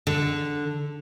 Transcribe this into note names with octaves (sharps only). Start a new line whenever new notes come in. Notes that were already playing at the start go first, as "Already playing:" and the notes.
D3